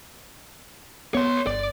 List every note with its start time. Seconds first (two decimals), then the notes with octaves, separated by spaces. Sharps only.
1.14 B3 C#5 C6
1.47 G1 D5